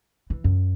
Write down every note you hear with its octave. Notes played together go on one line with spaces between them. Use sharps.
E3
F#2